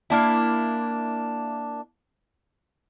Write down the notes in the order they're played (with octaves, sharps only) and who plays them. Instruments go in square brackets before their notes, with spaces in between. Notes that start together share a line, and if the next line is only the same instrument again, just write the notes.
[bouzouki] A#3 D4 E4